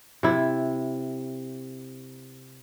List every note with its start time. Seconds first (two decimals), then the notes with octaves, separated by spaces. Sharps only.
0.23 C3 E4